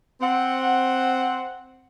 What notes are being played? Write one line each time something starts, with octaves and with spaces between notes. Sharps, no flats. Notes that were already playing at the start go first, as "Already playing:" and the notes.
C4 F#5